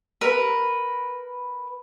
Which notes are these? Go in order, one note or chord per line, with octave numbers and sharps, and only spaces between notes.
A#4 B4